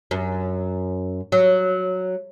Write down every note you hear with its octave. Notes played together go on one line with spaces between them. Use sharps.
F#2
F#3